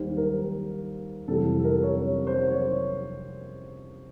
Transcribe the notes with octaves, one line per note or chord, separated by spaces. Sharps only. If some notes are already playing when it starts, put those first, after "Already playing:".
Already playing: D#2 D#3 G3 C5
A#4
F2 C3 E3 G3 A4
A4
A#4
C#5
C#5
C5
C#5